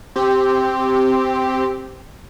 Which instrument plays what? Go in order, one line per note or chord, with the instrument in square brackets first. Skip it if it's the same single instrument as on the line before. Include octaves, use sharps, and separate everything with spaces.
[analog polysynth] C4 G4